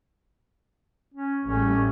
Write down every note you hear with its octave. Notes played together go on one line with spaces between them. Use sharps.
C#4
A1 G3 A3 C#4